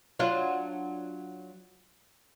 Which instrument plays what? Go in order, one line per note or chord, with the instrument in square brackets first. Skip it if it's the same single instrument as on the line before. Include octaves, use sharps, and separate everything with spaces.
[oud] F#3 D4 F4